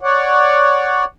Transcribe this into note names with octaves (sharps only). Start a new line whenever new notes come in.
C#5 D5 F#5